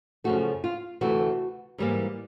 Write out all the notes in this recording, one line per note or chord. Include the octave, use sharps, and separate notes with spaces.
F#2 C#3 F3 A3 F#4
F4
D2 C3 E3 A3 F#4
G#2 E3 G3 A#3